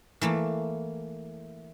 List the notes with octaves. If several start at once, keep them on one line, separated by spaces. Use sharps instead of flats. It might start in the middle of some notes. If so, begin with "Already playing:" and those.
E3 A3 A#3